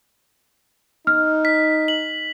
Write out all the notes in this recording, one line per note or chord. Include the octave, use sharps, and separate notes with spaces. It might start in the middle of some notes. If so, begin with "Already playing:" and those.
D#4 F6
B6
F#7